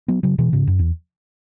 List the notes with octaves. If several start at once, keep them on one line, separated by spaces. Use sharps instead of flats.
F#3 B3
C#3 F#3
B2 E3
G#2 C#3
F#2
E2